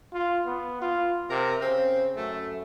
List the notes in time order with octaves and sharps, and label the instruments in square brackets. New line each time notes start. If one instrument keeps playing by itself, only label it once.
[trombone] F4
B3
F4
[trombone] C3 [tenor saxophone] A#4
[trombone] C#3 [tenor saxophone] C4
[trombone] F#2 [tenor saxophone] A3